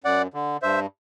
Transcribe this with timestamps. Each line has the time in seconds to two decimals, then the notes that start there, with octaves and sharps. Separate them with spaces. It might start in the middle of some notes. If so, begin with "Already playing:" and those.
0.04 F#2 D5 F#5
0.34 D3
0.62 G2 C5 E5